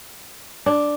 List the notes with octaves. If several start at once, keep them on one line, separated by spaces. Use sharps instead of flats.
D4